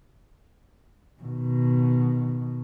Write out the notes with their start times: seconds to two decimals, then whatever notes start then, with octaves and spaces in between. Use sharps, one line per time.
1.23 B2 D#3